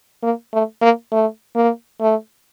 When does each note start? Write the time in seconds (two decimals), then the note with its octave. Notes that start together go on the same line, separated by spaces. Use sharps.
0.23 A#3
0.53 A3
0.82 A#3
1.12 A3
1.56 A#3
2.01 A3